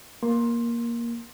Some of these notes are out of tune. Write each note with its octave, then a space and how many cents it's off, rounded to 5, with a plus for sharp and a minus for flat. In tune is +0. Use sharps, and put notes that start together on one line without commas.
A#3 +10 C6 +15